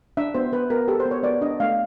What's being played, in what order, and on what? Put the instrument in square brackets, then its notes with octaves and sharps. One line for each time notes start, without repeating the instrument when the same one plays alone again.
[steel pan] D4 E5
B3 C5
B3 B4
B3 A#4
G4 A4
C5
B3
C#5
B3 D5
D4 D#5
A3 F5